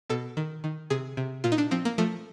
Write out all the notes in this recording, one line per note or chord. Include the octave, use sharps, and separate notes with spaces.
B2 A4
D#3
D#3
C3 G#4
C3
A#2 F4
D#4
D4
F3 C4
A#3
F3 A3